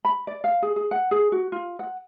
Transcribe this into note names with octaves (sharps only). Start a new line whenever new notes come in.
B5
D5
F5
G#4
G#4
F#5
G#4
F#4
F4
F#5